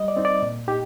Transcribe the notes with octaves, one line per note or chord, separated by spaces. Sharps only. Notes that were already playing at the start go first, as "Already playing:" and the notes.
Already playing: G3 D#5
D5
C4 D#4
D5
A#2
D#4 G4